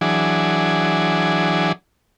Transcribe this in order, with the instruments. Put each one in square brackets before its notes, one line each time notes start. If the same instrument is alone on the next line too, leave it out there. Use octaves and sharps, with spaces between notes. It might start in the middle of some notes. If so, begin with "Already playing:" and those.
[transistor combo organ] E3 F#3 D4 G#4